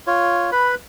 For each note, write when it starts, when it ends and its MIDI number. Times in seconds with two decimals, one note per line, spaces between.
0.07 0.50 65
0.07 0.50 73
0.52 0.75 71
0.52 0.75 83